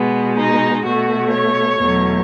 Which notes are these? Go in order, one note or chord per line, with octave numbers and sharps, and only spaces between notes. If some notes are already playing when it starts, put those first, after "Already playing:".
Already playing: B2 G#3 B3
D#4
B2 A3 F#4
C#5
E2 B2 F#3 A3